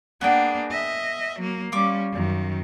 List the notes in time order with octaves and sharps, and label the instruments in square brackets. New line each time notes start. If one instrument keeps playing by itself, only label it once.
[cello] A#3 D4 [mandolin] B3 G#4 G5
[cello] D#5 E5
F#3 A#3
[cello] G3 C#4 [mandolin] F4 C#6 D6
[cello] F#2 D#3